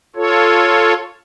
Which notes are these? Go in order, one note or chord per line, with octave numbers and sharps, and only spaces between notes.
F4 A4 C#5